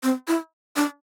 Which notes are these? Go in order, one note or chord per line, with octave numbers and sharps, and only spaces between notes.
C4
E4
D4